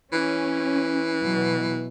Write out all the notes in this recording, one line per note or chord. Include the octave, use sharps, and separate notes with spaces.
E3 C#4
B2 F#3